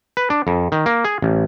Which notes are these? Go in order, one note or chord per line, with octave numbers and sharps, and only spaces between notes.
B4
D4
F2
D#3
A#3
G#4
A1